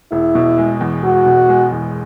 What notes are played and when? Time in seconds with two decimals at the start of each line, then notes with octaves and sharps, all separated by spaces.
0.12 E1 E4
0.35 B2
0.58 G#3
0.80 E2
1.03 E1 F#4
1.26 B2
1.49 G#3
1.72 E2